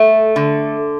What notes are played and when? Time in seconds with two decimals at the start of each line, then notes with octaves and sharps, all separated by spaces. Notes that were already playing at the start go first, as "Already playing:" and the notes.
Already playing: A3
0.36 D3